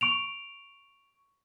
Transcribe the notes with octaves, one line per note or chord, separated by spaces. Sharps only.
C#6 D7 F7